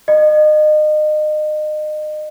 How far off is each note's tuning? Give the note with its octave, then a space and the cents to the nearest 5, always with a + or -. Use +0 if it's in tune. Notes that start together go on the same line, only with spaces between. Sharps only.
D#5 -35